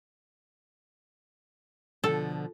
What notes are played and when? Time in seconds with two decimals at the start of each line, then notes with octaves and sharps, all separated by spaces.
2.04 B2 D3 F3 A4